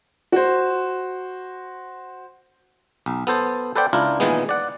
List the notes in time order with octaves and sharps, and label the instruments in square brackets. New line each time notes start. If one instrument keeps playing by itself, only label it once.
[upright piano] F#4 C5
[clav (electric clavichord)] B1
B3 A4 C5 A5
A4 B4 C5 D5 F#5 G5
C#2 D4 E4 F4 A#4
A#2 D#3 E3 G#3 B3
D5 F#5